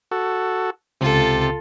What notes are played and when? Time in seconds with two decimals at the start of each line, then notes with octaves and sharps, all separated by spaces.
0.11 F#4 A4
1.01 C#2 C3 F4 A4